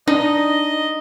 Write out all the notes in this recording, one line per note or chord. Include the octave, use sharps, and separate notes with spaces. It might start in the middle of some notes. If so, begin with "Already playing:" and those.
D4 D#4 D#5